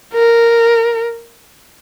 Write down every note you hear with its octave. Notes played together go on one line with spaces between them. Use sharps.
A#4